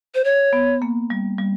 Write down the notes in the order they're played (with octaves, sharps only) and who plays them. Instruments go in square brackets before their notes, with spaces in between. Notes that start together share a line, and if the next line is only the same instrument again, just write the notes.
[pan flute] C5
C#5
[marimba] B3
A#3
G3
G3